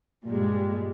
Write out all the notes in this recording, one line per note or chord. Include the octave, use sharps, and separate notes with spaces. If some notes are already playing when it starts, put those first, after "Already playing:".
G2 A#2 G3 G#3